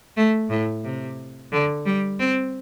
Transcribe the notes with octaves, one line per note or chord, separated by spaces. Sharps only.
A3
A2
C3
D3
G3
C4